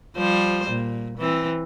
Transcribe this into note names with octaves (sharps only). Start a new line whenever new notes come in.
F3 G3 C5
A#2
E3 C4